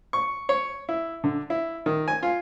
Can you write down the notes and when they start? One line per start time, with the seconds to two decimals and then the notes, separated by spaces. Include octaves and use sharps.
0.13 C#6
0.49 C#5
0.89 E4
1.24 D3
1.50 E4
1.86 D#3
2.08 G#5
2.23 F4